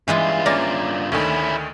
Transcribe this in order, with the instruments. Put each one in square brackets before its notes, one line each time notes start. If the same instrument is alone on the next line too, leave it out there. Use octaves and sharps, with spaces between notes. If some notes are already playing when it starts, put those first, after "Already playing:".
[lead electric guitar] G2 F4 [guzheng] E3 G#3 E4
[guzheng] A#3 [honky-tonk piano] C#4 D5 A#6
[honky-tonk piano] D2 D3 D#3 [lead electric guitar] C#4 E4